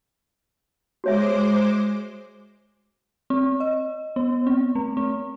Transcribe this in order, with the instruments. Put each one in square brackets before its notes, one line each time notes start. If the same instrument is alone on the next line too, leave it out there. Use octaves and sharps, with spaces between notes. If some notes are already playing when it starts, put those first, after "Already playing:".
[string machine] G#3 C5 D6 [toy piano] F#4 C#5 E5
[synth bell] C4
D#5
B3
C4
A3
C4